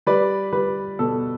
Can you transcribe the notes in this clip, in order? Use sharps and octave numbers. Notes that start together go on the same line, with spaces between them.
G3 B4 D5
G3 B4
B2 A4